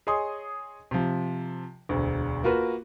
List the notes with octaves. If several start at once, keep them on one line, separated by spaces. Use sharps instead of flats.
G#4 C#5 D#5 G#5 C6 D#6
C3 F3
E1 D2
A#3 F4 F#4 A#4 B4